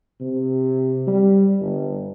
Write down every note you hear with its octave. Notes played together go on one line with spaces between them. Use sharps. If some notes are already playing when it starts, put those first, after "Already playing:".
C3
G3
G1